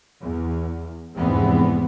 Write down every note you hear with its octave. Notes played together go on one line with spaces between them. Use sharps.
E2
F1 E2 G#2 E3 B3 C4